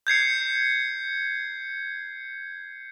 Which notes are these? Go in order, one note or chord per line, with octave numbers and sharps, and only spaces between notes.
G6 G#6 C7 C#7